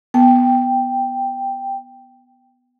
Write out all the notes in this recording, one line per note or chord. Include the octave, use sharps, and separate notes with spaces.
B3 G5